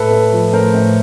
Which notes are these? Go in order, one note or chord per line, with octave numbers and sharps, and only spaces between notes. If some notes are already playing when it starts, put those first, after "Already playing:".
Already playing: A2 A4 B4
A3
F3
A2 A#4 C5
A2